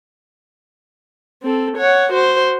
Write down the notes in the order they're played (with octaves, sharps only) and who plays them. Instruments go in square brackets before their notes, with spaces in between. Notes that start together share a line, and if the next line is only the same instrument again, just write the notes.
[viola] C4 A4
C#5 F#5
F#4 C5